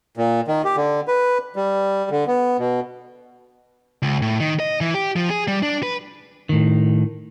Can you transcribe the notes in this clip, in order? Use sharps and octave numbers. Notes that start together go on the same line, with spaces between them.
A#2
D#3
G4
D3
B4
G3
D3
B3
B2
C#2
A2
D#3
D#5
E3
G4
F3
G#4
G3
D4
B4
A2 D#3